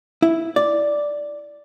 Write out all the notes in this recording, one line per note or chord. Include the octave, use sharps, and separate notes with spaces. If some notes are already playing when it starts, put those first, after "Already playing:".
E4
D5